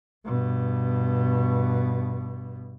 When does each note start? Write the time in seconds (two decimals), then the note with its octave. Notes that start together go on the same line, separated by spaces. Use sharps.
0.25 G2 B2